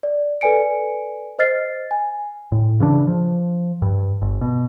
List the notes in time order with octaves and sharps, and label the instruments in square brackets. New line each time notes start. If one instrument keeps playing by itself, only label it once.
[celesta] D5
A4 B4 D5 G#5 C#7 D7
C5 D#5 F6 A6 C7
G#5
[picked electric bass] A2
C#3 E3 D4
F3
G2
G1
B2